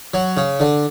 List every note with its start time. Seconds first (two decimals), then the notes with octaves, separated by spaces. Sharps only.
0.14 F#3
0.37 C#3
0.60 D3